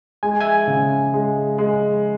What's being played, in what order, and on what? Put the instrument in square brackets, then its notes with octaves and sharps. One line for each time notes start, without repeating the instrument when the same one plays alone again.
[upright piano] G#3 [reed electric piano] G#5
[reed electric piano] E5 G#5
[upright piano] C#3
G#3
G#3